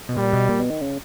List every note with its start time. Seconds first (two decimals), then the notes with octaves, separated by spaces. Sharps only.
0.09 B2
0.16 A#2 G3
0.33 B2
0.49 A#2
0.59 B2
0.70 D#3
0.81 C#3